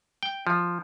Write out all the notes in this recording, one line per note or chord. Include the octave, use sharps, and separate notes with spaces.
G5
F3